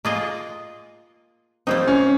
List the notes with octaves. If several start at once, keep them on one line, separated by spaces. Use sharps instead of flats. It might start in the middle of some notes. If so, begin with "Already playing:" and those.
A#3 F4 G#4 D#5
G3 A#3 C4 D#4
C#4